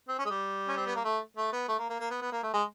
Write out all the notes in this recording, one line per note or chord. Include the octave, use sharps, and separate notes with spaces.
C4
C#4
G#3
G3
C#4
C4
B3
A#3
A3
A3
B3
A3
A#3
A#3
A#3
B3
B3
A#3
A3
G#3